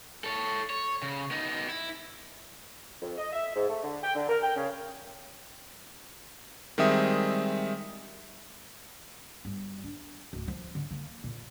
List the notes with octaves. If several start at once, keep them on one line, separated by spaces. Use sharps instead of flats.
A4 C#5
C#5
C#3
B3 D#4
E4
F2
D#5
E5
G#2
A3
D3
G5
D3
A#4
G5
C#3
D#3 G3 G#3 C4 E5 D#6
G1
D4
D1
F3
D3
A#3
A#2